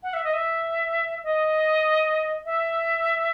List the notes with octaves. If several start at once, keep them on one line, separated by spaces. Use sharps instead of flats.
F#5
E5
D#5
E5
D#5
E5